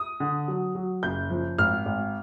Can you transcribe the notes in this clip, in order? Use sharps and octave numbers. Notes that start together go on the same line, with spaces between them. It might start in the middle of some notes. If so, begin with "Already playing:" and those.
Already playing: D#6
D3
F#3
F#3
F#1 G6
F3
G#1 F6
G#1